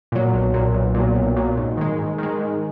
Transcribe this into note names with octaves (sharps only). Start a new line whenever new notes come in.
A#2 F#3
B1
A#2 F#3
B1
A#2 F#3
B1
A#2 F#3
G#2
D#3 G#3
G#2
D#3 G#3
G#2